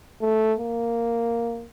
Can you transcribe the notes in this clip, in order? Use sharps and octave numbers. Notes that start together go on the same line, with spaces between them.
A3
A#3